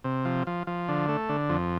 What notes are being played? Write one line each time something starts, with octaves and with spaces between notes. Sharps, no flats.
C3
F3
F3
F3
D3
A3
D3
F2